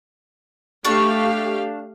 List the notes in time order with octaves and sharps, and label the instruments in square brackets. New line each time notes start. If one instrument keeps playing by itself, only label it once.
[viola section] A3 G4 F5 [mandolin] D4 C#6